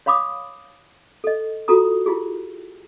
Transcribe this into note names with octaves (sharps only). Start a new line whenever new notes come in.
C#5 F5 B5 D6 D#6
A4 D#5
F4 F#4 A4 A#5 D#6
E4 F4 G4 G#4